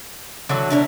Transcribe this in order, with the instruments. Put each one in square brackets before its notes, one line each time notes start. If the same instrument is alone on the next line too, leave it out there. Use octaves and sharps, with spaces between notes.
[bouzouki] D3 E3 F#3
[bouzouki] B2 E4 A#4 [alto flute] D4